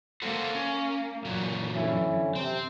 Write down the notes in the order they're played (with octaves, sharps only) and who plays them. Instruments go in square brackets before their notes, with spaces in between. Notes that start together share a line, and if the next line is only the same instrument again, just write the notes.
[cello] A#3 [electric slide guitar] A4 C5 F#5
[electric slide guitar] C#4
[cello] F#2 E3 [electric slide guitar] A#2 F#3
[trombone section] D3 C#4 E4
[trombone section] C3 [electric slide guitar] C4